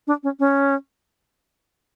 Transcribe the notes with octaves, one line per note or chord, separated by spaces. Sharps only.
D4
C#4
C#4